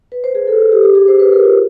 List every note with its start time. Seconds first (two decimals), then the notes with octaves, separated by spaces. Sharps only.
0.12 B4
0.24 C5
0.35 G#4
0.47 A4
0.72 G4
0.83 G4
0.95 G#4
1.08 C5
1.19 B4
1.32 A#4
1.44 F4